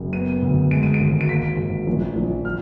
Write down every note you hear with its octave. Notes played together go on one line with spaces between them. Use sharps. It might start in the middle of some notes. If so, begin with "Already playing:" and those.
Already playing: F#1
B3 D#7
D2
G#3 D7
D#7
D7
G#1
D7
A#3 B6
G#1
A#1
A#1
F6